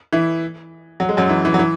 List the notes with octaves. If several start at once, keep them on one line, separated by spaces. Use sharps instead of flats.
E3 E4
F#3
G#3
F#2 F#3
E3
E3
F#3
E3